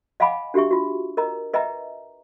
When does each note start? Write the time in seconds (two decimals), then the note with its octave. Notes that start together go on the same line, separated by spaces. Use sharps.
0.20 D#5 F5 F#5 G#5 B5 D6
0.54 D4 F#4 G4 E5 C#6
0.71 F4 F#4
1.17 A#4 D#5 A#5
1.54 B4 D#5 E5 G5 A#5